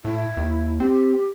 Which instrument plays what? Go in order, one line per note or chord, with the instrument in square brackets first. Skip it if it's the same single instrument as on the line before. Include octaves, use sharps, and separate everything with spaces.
[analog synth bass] A2 [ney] E4
[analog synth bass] D#2
[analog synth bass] C4 [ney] G4